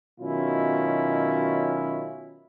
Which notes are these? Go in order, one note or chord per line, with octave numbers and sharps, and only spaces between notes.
B2 D#3 F#3 C#4 E4 F4